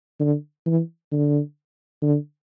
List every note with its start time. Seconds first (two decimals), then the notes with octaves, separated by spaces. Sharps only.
0.20 D3
0.66 E3
1.12 D3
2.02 D3